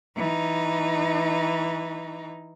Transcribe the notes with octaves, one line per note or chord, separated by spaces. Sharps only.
E3 D#4